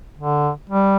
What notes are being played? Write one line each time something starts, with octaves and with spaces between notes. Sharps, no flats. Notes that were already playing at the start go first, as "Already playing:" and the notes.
D3
G3